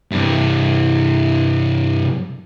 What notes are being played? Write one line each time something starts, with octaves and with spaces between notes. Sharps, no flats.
G2 C3